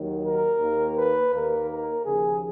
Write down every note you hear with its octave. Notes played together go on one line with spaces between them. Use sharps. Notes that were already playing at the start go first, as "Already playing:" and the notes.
Already playing: D#2 D#3 F#3
A#4
D#2 D#3 A#3
B4
D#2 D#3 A#3 A#4
A#4
D#2 C#3 F3 G#4